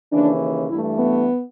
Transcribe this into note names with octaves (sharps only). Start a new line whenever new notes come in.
D#2 C#3 E3 D4
G2 E3 A3 E4
B3